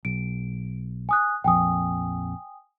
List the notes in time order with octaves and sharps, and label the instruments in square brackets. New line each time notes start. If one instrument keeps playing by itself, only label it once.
[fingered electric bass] B1 [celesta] D7
[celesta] G#5 D#6 F#6
[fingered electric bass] A#1 F2 [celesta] G5 G#5 D#6